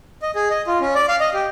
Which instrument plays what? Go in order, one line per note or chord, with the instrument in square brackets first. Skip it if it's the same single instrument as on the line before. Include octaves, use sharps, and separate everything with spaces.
[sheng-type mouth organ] D#5
G#4
D#5
F4
C#4
D5
F5
D#5
G4